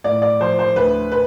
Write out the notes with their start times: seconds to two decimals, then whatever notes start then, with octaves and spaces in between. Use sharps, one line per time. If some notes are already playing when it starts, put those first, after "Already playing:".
0.04 A2 D5
0.22 D5
0.40 F3 C5
0.59 C5
0.76 D2 B4
1.12 B4